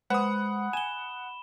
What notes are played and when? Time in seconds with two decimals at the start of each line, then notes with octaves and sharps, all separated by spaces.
0.10 G#3 B4 C5 F#5 B5 D#6
0.73 G#5 E7 G7